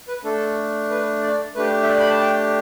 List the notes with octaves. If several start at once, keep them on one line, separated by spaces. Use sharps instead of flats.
B4
A3 D4 A4
B4
D5
A3 D4 G4 B4
E5
D5
B5
A5
G5